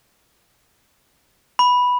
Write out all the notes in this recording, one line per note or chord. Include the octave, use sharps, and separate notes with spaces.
B5